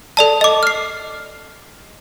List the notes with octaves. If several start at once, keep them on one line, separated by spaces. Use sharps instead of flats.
A4 D5 A5
D#5 D6
F6 C7